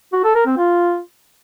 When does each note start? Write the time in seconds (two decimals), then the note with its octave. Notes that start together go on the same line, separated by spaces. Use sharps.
0.13 F#4
0.24 A4
0.35 A#4
0.46 C4
0.57 F4